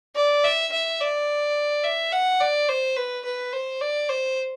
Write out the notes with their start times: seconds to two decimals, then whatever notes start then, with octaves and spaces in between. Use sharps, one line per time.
0.15 D5
0.44 E5
0.72 E5
1.00 D5
1.84 E5
2.12 F#5
2.40 D5
2.68 C5
2.96 B4
3.25 B4
3.53 C5
3.81 D5
4.09 C5